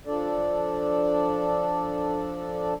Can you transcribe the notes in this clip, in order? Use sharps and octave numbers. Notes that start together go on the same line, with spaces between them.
F3 D4 A4 D5